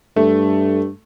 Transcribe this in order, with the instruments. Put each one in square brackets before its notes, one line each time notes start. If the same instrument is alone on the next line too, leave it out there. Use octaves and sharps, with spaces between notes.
[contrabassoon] G2 [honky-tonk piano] A3